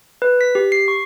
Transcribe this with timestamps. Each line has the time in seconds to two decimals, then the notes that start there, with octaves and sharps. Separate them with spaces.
0.22 B4
0.41 B6
0.55 G4
0.72 C7
0.88 C#6